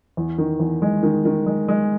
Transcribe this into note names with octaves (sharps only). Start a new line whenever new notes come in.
E2
D#3
E2
G#3
D#3
D#3
G#3
G#3